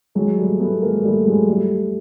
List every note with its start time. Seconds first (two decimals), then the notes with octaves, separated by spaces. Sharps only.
0.15 F#3 G#3
0.38 G3 A3
0.59 A3 B3
0.81 G#3 A#3
1.04 G3 A3
1.26 F#3 G#3
1.48 G3 A3